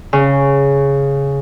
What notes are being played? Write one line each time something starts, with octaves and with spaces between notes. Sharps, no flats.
C#3